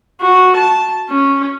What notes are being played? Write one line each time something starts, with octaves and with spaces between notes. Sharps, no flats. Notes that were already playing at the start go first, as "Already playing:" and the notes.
F#4
A5
C#4